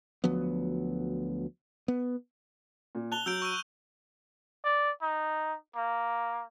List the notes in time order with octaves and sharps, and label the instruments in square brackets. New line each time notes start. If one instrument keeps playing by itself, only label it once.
[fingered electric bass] D2 F3 F#3 B3
B3
[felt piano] A#2
[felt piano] A5 [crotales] F#6 F7 G7
[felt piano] F#3 [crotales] E6 G6 D7
[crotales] C#6 E6 D#7
[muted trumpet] D5
D#4
A#3